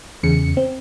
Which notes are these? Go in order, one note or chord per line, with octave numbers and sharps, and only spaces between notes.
E2 C#3 C#7
C4